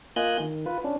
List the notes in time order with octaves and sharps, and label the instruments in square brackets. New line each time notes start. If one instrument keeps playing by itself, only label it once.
[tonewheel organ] A#3 F4 D#5 G#5 F#6 G6
D#3
F4 B4
C#4 D4